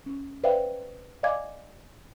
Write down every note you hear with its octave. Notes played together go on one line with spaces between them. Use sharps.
C#4
B4 C5 D5 E5 F5 G5
D5 D#5 F5 G#5 D6 G#6